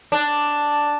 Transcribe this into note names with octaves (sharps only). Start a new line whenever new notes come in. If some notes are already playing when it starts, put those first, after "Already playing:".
D4 A5